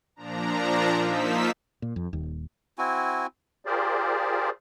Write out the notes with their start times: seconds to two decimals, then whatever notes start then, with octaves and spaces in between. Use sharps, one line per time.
0.16 A#2 F3 D4 A#5
0.99 F3 A#3 D#4 E6 B6
1.82 A#2
1.96 F2
2.13 D#1 D#2
2.78 C4 E4 F#4 G#5
3.65 F4 G4 G#4 A#4 C5 D5